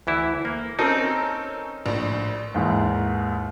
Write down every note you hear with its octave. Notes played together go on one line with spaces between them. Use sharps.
D2 E3 E4
A#3
C4 C#4 D#4 A4 A#4
A#1 A2
D#2 G#2 E3